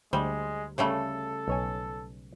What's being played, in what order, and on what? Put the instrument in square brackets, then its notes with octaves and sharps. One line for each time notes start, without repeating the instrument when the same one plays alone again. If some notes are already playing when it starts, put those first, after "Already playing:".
[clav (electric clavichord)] D2 C5 [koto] G3 [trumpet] G#3
[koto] C#3 G3 A3 [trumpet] A4
[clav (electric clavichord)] B1 C#5 G#5